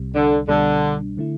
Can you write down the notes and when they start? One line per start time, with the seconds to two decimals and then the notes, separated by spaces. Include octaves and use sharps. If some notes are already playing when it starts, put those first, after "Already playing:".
Already playing: C2 C3 G3
0.14 D3
0.48 C2 B2 D3 G3 D4
1.17 D3 A3 E4